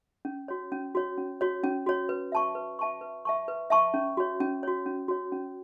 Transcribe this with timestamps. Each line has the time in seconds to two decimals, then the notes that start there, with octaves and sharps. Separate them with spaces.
0.25 C#4
0.48 F#4 C#5
0.72 C#4
0.95 F#4 C#5
1.18 C#4
1.41 F#4 C#5
1.64 C#4
1.86 F#4 C#5
2.09 B4
2.32 E5 A5 C#6
2.55 B4
2.79 E5 A5 C#6
3.01 B4
3.25 E5 A5 C#6
3.48 B4
3.70 E5 A5 C#6
3.94 C#4
4.17 F#4 C#5
4.40 C#4
4.63 F#4 C#5
4.86 C#4
5.08 F#4 C#5
5.32 C#4